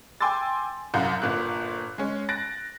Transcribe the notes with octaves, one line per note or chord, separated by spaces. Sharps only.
G5 G#5 C6 D6 E6 A6
C2 F#2 F5 F#5 A#5 G6
G1 A#2 F#6
G#3 C#4
F#6 A6 A#6 D7